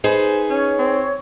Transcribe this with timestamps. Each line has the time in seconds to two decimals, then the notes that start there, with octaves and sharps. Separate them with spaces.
0.04 D#4 G#4 B4 C5
0.50 C#4 C#5
0.78 C4